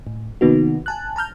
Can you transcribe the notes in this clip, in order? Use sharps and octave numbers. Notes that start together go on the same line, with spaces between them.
A2
C3 D#3 A#3 B3 D#4 F#4
G#5 A5 F#6
A5 A#5 F6 G6